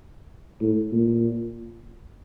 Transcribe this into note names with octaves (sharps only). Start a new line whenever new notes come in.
A2
A#2